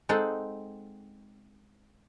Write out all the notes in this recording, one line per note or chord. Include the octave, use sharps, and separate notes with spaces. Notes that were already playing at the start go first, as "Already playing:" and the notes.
G#3 C4 D#4 A4 F#5